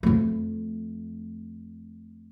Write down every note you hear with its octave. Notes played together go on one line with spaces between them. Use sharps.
F2 A3